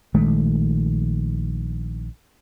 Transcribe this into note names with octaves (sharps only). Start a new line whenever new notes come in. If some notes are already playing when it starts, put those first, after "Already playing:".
A#1 D#3 G#3 A3